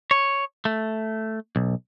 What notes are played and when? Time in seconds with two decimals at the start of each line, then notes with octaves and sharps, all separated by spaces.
0.11 C#5
0.65 A3
1.56 B1